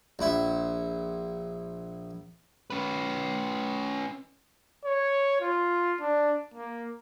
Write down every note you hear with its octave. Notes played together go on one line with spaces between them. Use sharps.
A#1 E4
C#4 B4
C#5
F4
D4
A#3